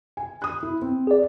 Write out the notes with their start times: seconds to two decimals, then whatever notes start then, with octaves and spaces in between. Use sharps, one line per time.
0.17 G#5
0.42 D#6 F#6
0.63 E4
0.82 C4
1.07 G#4 D5